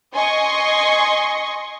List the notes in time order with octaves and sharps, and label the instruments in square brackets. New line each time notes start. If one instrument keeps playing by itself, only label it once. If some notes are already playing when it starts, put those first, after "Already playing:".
[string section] D#5 G#5 C6 C#6